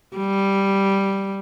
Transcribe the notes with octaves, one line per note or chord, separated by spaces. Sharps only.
G3